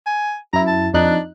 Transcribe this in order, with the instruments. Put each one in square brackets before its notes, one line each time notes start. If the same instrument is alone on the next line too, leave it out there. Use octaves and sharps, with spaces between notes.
[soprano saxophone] G#5
[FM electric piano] F#2 E4 [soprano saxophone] A#5
[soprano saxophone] A5
[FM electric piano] F2 D#4 F#6 [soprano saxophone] D4